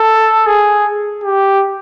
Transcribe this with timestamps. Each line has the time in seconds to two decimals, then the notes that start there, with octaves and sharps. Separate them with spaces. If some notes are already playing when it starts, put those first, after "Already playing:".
Already playing: A4
0.46 G#4
1.24 G4